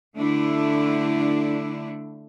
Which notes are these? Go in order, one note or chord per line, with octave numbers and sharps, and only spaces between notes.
D3 A3 D4 E4